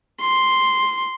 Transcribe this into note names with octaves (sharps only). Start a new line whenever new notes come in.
C6